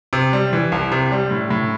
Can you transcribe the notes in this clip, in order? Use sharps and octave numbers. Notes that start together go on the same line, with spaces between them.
C3
G3
E3
C2
C3
G3
A2
A2